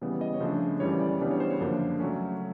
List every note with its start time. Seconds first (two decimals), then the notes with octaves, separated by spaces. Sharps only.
0.02 C#3 E3 G3 B3
0.21 D#5
0.34 C#5
0.40 C#3 F3 A3 D4 C5
0.80 F#2 C#3 E3 G3 C#5
1.01 D5
1.20 C#3 E3 G3 B3 D4 D5
1.31 C#5
1.40 C5
1.50 C#5
1.60 F#2 D3 F3 A#3 D4
2.00 C#3 F#3 A3 C#4